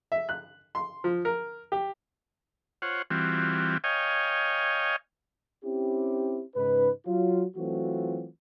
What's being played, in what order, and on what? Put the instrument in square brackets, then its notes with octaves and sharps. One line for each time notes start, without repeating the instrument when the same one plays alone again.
[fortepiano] E5
F#6
C6
F3
A#4
G4
[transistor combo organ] F4 C5 C#5 F#5
E3 G3 C4 F4 F#4
C#5 D#5 F5 G5 G#5
[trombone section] C4 C#4 E4 G4
G#2 C#3 D#4 B4
F#3 F4
E3 F#3 A3 C4 F4 F#4